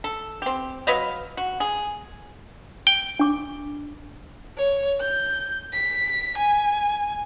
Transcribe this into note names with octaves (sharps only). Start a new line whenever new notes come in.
A4
C4 G4
F#3 B4 D#5 F5
F#4
G#4
G5
D4 D6
C#5
G6
B6
G#5